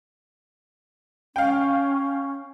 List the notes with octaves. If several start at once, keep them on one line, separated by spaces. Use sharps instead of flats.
C#4 F5 G5